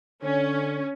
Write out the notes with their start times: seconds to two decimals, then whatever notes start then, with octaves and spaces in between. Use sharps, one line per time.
0.23 D3 C#4